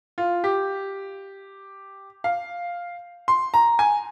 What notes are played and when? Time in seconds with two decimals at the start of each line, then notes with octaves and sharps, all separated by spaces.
0.18 F4
0.44 G4
2.24 F5
3.28 C6
3.54 A#5
3.79 G#5